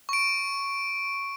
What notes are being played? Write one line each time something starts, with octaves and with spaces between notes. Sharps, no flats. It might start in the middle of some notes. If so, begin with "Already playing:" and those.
C#6 D7